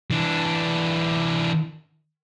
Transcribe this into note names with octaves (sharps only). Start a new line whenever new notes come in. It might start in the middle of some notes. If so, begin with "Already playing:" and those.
E3 D4